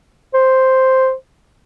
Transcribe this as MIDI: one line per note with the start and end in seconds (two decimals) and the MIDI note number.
0.34 1.13 72